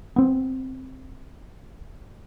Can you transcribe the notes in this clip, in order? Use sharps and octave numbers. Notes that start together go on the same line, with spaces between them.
B3 C4